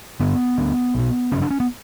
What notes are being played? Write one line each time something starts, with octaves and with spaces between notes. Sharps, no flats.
G1 G2 D3 B3
D2 D3
B1 B2
G1 F#2 C#3 C#4
D4
C#4
B3